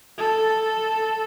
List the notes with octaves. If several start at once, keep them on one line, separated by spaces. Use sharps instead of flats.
A4